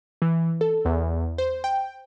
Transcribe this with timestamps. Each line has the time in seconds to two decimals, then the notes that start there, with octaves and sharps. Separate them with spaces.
0.22 E3
0.61 A4
0.85 E2
1.38 C5
1.64 G5